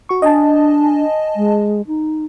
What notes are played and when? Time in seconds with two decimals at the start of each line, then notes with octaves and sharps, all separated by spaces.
0.09 F#4 C#6
0.22 D4 D#5 G#5 A5
1.36 G#3
1.87 D#4